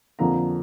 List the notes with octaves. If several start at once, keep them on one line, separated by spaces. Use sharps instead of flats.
F2 D3 F3 A#3 A#5